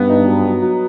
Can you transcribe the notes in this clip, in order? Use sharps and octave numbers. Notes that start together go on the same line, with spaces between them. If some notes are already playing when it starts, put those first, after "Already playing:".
Already playing: G2 B3
D#4
F#3
F#3
F#3